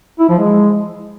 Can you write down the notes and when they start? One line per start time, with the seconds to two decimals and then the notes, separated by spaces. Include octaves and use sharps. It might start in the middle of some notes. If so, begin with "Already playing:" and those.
0.19 E4
0.29 F3
0.39 G#3